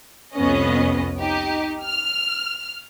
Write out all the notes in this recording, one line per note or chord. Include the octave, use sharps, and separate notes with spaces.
C2 F2 B3 C#4 D#5
D#4 G4
F6